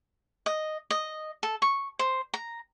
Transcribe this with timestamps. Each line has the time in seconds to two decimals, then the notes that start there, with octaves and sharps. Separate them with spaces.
0.46 D#5
0.91 D#5
1.43 A4
1.62 C#6
1.99 C5
2.34 A#5